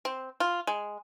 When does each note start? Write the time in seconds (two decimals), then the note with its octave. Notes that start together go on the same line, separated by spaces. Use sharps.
0.05 C4
0.40 F4
0.67 G#3